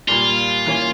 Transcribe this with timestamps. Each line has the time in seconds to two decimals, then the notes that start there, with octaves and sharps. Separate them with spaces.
0.08 A#2 G3 A#3 F4
0.66 E3 A#3 C#4